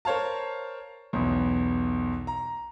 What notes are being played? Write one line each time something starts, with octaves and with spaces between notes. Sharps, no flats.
A#4 C5 C#5 F5 A5
B1 E2
A#5